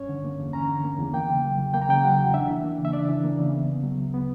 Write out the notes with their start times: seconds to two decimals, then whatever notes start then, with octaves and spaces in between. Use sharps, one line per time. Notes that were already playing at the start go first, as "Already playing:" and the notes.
Already playing: G2 C#4 C#5
0.09 D3
0.25 A#3
0.40 E2
0.53 C#4 A#5
0.69 D3
0.84 A#3
0.99 E2
1.13 A#3 G5
1.29 C#3
1.44 F#3
1.58 E2
1.74 A#3 G5
1.81 A#5
1.89 C#3 G5
2.04 F#3 F#5
2.18 E2
2.34 D4 E5
2.49 E3
2.63 A#3
2.78 C#3
2.85 E5
2.93 D4 D5
3.09 E3
3.24 A#3
3.38 C#3
3.54 B3
3.68 C#3
3.83 F#3
3.98 D2
4.14 B3